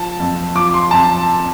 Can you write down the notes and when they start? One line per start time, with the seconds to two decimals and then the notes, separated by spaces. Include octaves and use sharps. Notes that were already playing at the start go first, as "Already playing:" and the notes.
Already playing: F3 A5
0.20 F2
0.55 F3 D6
0.74 C6
0.91 F2 A5